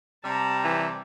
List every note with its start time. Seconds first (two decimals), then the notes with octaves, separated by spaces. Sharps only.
0.24 C3 G3 A5 A#5
0.64 E3